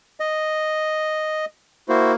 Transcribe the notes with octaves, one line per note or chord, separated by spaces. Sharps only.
D#5
A#3 E4 F#4 C5